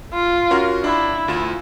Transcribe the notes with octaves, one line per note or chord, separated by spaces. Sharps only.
F4
C#4 F#4 A#4
D4 E4
D2 F4 E7